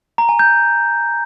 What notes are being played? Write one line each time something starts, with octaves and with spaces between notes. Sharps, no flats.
A#5
G#5
G6